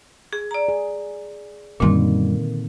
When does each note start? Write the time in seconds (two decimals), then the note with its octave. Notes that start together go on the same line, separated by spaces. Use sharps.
0.33 G#4
0.51 D5 A#5
0.69 G#4
1.80 F#2 A#2 D3 D#3 G3 A#3 C4